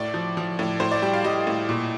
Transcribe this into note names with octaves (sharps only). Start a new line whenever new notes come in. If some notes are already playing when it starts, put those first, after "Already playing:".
Already playing: A2 D5
F3
F3
A2
A2 C5
D5
G3 G5
F5
G3 D#5
A2
A#2